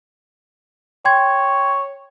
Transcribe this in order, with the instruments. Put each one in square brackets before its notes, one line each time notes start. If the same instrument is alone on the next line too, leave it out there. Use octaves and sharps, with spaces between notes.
[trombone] C#5 [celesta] G5 C6 G#6